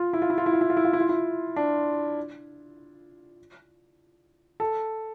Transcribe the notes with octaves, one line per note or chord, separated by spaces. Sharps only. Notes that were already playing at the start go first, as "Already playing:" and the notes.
Already playing: F4
E4
F4
E4
F4
E4
F4
E4
F4
E4
F4
E4
F4
E4
D4
A4